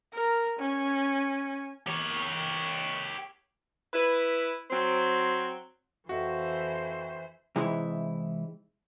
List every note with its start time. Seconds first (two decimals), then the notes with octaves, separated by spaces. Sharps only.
0.14 A#4
0.59 C#4
1.86 G4 C#5
3.93 E4 B4
4.70 F#3 C4
6.09 F2 E3 F#4 C5 E5
7.56 C3 E3 G#3 D#4 E4